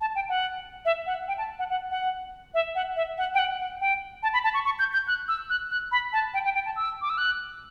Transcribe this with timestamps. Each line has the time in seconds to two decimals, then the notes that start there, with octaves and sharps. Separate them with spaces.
0.01 A5
0.15 G5
0.29 F#5
0.85 E5
1.06 F#5
1.28 G5
1.38 A5
1.59 F#5
1.70 F#5
1.91 F#5
2.54 E5
2.75 F#5
2.96 E5
3.18 F#5
3.34 G5
3.39 F#5
3.59 F#5
3.81 G5
4.23 A5
4.33 B5
4.44 A5
4.54 C#6
4.65 C#6
4.79 G6
4.93 G6
5.07 F#6
5.28 E6
5.50 F#6
5.71 F#6
5.92 B5
6.13 A5
6.34 G5
6.44 G5
6.55 G5
6.66 A5
6.76 E6
7.02 D6
7.10 E6
7.18 F#6